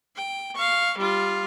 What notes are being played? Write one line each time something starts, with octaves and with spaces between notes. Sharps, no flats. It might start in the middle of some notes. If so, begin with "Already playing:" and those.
G5
F5 C#6
G3 F4